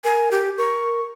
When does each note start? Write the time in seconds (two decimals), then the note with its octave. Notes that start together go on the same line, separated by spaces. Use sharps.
0.04 A#4 G#5
0.31 G4
0.58 A#4 C#6